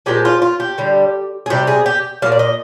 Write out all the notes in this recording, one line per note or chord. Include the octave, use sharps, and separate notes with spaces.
A#2 F3 G#3 G4
F4
F4
G4
D3 G3
G#4
C3 G3 G4
G#4
G4
A#2 G3 F5
D5
D#5